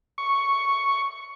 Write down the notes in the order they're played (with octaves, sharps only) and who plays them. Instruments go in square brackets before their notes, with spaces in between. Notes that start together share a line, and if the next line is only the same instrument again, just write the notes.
[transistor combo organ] C#6